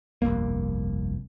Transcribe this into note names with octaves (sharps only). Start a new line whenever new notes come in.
G1 C2 F2 A#3